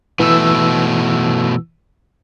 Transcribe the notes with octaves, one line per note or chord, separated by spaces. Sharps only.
B2 E3 A3 E6